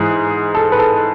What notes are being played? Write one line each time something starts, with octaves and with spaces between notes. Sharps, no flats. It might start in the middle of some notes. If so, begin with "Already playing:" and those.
Already playing: G#2 E3 G#4
A4
B4
A4